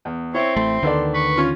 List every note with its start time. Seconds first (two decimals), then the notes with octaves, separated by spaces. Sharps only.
0.05 E2
0.34 C4 E4 C#5
0.56 A1 A3 C6
0.83 D2 D3 D#3 B3 A4 D5
1.14 B4 C#6
1.37 C#4 F4